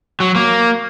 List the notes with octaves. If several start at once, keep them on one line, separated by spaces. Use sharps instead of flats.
F#3
A#3